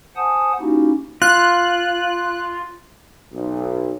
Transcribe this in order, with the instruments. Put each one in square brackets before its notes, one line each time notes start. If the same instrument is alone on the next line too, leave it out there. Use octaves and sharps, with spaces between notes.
[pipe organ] C5 F#5 G#5 A5 D#6
A#3 C#4 D#4 E4 F#4 G4
[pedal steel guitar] F4 [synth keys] F#6
[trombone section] B1